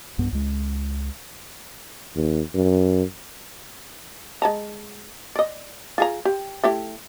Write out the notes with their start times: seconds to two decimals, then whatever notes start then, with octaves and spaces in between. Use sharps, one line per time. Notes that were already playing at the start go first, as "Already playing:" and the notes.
0.18 B1 G2 B3
0.32 C#2 G#3
2.16 D#2
2.55 F#2
4.42 G#3 A5 A#5
5.36 D5 D#5
5.98 F4 G#4 A#5
6.25 G4
6.64 A3 E4 G4